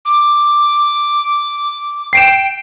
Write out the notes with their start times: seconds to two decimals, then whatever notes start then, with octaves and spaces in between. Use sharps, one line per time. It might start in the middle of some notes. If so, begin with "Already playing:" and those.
0.05 D6
2.13 G5 C7 D7 E7